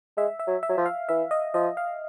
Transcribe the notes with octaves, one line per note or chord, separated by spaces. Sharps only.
G#3 E5
E5
F#3
E5
F#3
F3
F5
E3 E5
D#5
F3 D#5
F5